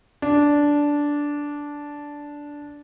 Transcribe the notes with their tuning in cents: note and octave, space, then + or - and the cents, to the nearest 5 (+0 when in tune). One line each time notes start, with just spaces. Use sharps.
D4 -10